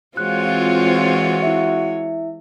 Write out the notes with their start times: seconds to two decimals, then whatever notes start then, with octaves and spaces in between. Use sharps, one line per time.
0.17 E3 G#3 C4 F4 F#4 C#5 F#6
1.43 E4 E5